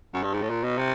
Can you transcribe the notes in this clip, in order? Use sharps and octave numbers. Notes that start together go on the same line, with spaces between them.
F#2
G2
G#2
A2
A#2
B2
C3